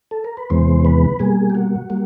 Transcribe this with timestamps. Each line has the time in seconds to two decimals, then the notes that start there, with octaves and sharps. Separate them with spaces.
0.11 A4
0.24 A#4
0.37 B4
0.50 E2 C3 E3 G#3 B3 C5
0.85 B4
1.19 B2 G3 A#3 G#4
1.50 G4
1.55 F#4
1.90 G3 A#3